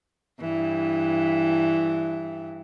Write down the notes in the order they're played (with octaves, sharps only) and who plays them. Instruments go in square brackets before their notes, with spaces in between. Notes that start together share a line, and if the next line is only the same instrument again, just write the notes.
[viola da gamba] G2 E3